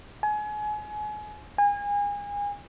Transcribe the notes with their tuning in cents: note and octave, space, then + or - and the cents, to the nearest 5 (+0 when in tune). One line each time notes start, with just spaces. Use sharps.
G#5 +30
G#5 -30